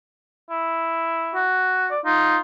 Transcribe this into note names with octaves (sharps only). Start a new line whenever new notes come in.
E4
F#4
D5
D#4 F4